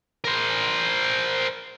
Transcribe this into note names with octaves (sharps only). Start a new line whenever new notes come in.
A#4 C5